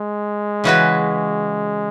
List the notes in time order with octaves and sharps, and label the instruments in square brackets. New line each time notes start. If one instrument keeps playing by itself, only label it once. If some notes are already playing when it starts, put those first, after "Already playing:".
Already playing: [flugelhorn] G#3
[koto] C#3 E3 C#4 F#4 B4